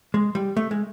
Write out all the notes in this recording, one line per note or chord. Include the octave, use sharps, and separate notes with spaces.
G#3
G3
A3
G#3